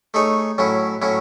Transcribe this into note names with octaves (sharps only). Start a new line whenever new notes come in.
A3 D#4 G#4 C#5
A2 F#3 C#4 E4
A2 F#3 C#4 E4